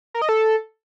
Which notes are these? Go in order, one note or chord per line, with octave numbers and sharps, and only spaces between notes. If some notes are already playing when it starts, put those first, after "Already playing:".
A#4
D#5
A4